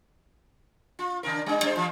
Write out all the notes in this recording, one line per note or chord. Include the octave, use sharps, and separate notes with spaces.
F4
C#3 D4 A#4
G3 D4
G3 D4 C5
E3 G3 F4